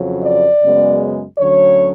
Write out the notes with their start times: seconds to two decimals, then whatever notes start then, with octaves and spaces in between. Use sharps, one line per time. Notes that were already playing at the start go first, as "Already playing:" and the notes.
Already playing: F2 C#3 F#3
0.24 D5
0.62 F#2 C#3 G#3 B3
1.38 D2 D3 F#3 C#4 C#5